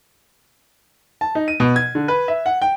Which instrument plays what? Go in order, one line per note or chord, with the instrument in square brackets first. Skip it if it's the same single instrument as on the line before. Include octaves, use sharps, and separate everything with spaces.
[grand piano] A5
D#4
D#7
B2
G#6
D3
B4
E5
F#5
G5